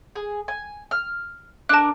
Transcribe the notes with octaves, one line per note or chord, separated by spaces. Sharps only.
G#4
G#5
F6
D4 A#4 A5 F#6